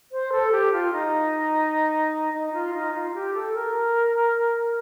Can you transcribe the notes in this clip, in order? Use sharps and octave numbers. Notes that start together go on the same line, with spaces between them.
C5
A4
G4
F4
D#4
D#4
F4
D#4
F4
G4
A4
A#4